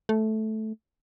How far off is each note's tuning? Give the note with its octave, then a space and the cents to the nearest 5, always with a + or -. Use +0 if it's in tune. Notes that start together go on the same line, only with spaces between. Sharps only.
A3 -10